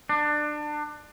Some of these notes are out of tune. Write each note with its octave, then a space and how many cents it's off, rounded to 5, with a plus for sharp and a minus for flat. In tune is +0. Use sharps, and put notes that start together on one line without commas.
D4 +25